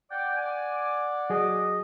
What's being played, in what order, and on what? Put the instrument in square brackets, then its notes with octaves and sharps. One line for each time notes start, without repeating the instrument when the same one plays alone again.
[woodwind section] D5 F#5 D6 [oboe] G5
[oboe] G#5
[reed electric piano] F#3 G#4 [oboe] D#5